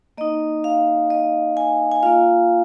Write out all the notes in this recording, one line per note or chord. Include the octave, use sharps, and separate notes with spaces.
A#3 D#4 D#5
F5
D#5
G#5
G#5
A#3 F4 F5